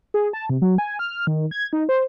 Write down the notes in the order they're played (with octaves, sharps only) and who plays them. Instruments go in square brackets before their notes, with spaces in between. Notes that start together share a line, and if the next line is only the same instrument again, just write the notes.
[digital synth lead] G#4
A5
C3
F#3
G#5
F6
D#3
G#6
D#4
C5